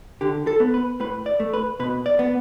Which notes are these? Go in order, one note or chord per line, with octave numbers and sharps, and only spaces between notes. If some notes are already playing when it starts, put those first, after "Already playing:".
D3 G4
A4
B3
B4
A2 B4
D5
A3
B4
B2 B4
D5
B3